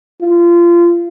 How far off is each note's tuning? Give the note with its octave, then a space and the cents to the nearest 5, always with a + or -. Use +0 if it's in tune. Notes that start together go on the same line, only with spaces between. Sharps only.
F4 -25